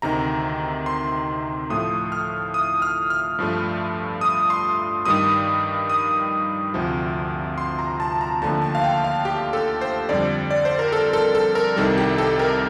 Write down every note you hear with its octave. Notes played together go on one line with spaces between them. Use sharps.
D2 C3 D#3 A#5
C6
A2 F3 A3 D#6
F6
D#6
F6
F6
G2 F3 A3
D#6
C6
G2 D#3 G3 D#6
D#6
D2 C3 F3
C6
A#5
A5
A#5
D#2 D3 F3 A3 A5
A5
F5
G5
F5
G4
A4
C5
F2 D3 G3 D5
D5
C5
A#4
A4
A4
A4
A#4
C2 C3 D#3 G3 A4
G4
A4
A#4